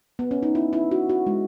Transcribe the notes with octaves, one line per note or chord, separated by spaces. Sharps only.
B3
C#4
D#4
E4
E4
F#4
F#4
G#3